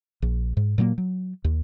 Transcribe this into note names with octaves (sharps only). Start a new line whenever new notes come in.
A#1
G#2
A#2 F#3 G3 A#3
F#3
D#2